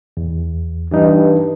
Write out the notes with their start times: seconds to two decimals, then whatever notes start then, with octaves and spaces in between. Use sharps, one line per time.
0.17 E2
0.92 G2 E3 D#4